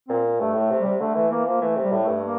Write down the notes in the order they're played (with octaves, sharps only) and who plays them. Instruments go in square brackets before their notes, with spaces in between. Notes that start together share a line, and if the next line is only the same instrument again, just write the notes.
[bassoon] A#2 [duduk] C4
[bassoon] G2 [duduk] A3
[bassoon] A2
[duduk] A3
[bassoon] C3
[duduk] G3
[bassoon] C3
[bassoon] D3 [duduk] A3
[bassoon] E3 [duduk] A3
[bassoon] E3 [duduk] A#3
[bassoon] F3 [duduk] A#3
[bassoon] E3 [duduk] A3
[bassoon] C3
[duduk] G3
[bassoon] A2
[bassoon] G2 [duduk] A3
[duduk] A#3